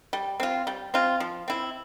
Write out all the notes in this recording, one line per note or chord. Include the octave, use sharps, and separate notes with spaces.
G3
C4 F4
G3
C4 F4
F3
C4 E4